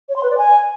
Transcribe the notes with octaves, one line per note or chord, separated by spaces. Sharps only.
C#5
C6
B4
D5
G#5